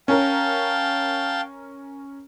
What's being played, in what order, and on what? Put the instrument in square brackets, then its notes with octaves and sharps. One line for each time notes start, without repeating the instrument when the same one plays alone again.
[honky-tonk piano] C#4 A#4 [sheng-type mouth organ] F5 G5 A5